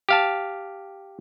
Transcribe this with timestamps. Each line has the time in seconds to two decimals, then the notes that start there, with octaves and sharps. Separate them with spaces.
0.09 G4 F5 A5